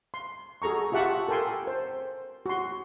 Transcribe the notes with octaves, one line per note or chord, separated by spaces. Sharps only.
C6
F#4 G#4 A4 A#5 C#6
F4 G4 E5 F#5 A5 C#6
A4 A#4 G5 G#5 C6
C5
F#4 C6